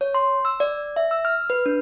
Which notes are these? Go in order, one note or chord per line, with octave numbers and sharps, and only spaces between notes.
C#5
C6
E6
D5
E5
E6
F6
B4
D4